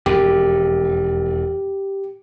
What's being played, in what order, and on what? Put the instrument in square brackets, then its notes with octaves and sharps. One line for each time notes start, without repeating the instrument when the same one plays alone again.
[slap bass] E1 F2 [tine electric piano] G4